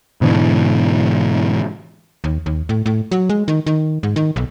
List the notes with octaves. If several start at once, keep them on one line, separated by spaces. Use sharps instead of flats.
G#2 B2 D3 E3
D#2
D#2
A2
A2
F#3
G#3
D#3
D#3
G#2
D#3
B1